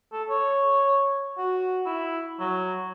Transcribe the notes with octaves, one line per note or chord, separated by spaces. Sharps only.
A4
C#5
F#4
E4
F#3